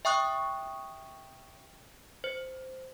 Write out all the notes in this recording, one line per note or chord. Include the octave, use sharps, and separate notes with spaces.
E5 G5 C#6 D#6 F#6
C5